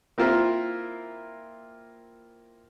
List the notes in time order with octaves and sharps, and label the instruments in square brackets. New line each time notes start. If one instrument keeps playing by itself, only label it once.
[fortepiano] A#3 C4 E4 F4 A#4